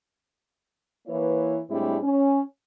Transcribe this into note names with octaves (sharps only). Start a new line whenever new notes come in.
E3 A#3 E4 B4 C#5
A2 G3 G#3 C4 D4 E4
C#4